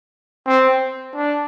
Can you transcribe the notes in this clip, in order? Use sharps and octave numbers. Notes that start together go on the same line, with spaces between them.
C4
D4